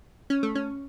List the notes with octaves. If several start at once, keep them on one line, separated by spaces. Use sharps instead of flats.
C#4
A3
C#4